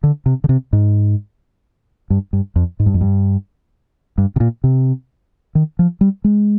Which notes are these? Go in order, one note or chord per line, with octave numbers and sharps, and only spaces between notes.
D3
C3
D3
C3
G#2
G2
G2
F2
G#2
G2
F2
G2
G2
C3
A#2
C3
D#3
F3
G3
G#3